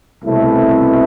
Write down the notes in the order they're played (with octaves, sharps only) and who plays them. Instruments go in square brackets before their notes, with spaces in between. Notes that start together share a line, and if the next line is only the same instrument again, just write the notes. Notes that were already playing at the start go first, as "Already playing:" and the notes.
[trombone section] C2 B2 A3 C4 E4